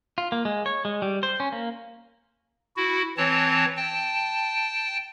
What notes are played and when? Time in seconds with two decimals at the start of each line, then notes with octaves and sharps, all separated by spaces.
0.18 F4
0.32 A#3
0.45 G#3
0.66 C#5
0.85 G#3
1.02 G3
1.23 C5
1.40 C#4
1.52 A#3
2.76 E4 F#4
3.17 E3 C4 C#5 A5
3.77 G5 A5